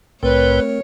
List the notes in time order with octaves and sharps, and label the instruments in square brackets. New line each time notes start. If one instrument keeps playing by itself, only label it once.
[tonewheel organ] C2 A2 G5 [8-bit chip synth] A3 C4 A#4 [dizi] B4 [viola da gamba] C#5